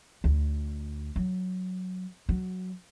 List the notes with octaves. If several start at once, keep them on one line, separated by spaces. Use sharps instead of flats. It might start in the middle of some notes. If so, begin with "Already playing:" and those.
D2
F#3
F#3